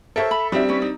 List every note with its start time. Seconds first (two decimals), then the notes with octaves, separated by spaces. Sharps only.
0.16 A4 A#4 C5 C#5 E5
0.31 B5
0.52 G3 C4 D4 D#4 F#4 E5
0.68 C#4 E4 B4
0.82 D#4